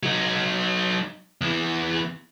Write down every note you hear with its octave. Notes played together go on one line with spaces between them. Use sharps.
F#3 D#4
E2 E3